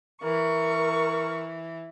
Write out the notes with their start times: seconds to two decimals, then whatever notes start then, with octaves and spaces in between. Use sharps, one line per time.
0.23 E3 A#4 C#6